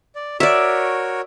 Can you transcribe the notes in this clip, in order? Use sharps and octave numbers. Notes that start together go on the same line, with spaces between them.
D5
F#4 A#4 C#5 D5 E5